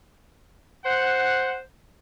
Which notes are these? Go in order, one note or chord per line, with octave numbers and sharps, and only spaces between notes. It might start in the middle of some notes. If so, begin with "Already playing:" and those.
C5 F#5